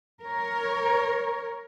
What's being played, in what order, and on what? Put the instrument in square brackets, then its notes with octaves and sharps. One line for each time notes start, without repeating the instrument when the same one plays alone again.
[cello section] A#4 C#5